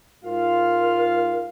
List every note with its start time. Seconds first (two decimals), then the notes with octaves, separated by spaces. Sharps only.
0.24 G#2 F4 A#4 F5